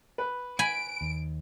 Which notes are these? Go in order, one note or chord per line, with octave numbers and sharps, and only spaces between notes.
B4
G#5 B5 D7
D#2